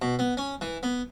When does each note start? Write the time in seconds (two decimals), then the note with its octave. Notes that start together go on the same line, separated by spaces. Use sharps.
0.02 B2
0.19 B3
0.37 C#4
0.61 E3
0.83 B3